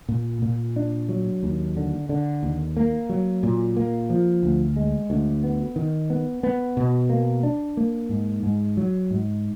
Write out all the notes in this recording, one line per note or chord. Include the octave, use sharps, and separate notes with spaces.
A#2
A#2
D4
F#3
D#2
D3
D3
D#2
A#3
F#3
A#2
A#3
F3
D2
G#3
D2
B3
D#3
B3
B3
B2
A#3
D4
A#3
G#2
G#2
F#3
G#2